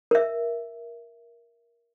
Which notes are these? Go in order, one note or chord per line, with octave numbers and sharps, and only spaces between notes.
A#4 E5